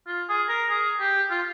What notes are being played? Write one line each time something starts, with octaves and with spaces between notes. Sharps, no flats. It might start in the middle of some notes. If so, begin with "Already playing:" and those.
F4
G#4
A#4
G#4
G4
F4